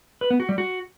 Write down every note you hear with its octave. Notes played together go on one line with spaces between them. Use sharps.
B4
B3
F#4
G3
F#4